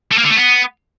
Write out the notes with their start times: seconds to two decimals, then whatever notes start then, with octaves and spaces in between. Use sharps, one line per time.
0.11 A3
0.18 A#3
0.24 D3
0.30 A3
0.37 B3